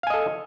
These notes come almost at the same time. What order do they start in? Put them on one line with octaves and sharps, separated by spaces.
F5 G#5 D#5 A4